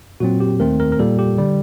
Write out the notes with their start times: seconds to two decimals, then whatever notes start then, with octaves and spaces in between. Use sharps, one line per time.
0.20 A#2 F#3 C4 F#4
0.40 G4
0.60 D#2 D#3 A3 C4 A#4
0.80 A#4
0.92 A#4
0.99 A#2 G3 A#3 A4
1.19 G4
1.38 D3 G3